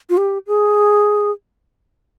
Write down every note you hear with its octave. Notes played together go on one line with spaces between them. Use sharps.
F4
G4
G#4